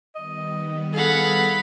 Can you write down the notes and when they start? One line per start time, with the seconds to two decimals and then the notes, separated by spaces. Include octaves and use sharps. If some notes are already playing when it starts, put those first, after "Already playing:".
0.15 D#3 G3 B3 D#5
0.94 G#4 A4 F5 F#5 B5